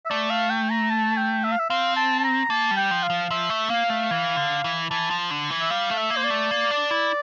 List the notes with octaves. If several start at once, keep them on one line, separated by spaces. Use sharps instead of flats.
E5
A3 D5
F5
G5
A#5
A5
G5
E5
F5
E5
C4 F5
A5
A5
A#5
A#3 A5
G3
G5
F3
F5
F3
F3 E5
A3
A#3 F5
A3
E3
D3
E3
E3 A5
F3
D3
E3
E5
G3 F5
A3
E5
A#3
C5
D5
A3
A#3
D4
E4